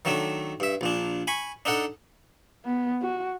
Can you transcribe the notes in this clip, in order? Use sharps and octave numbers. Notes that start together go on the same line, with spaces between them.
D#3 F#3 A3 D4
G2 E5
A#1 A#2 D4
G#5 B5 C#6
D4 D#4 A4 F#5
B3
F#4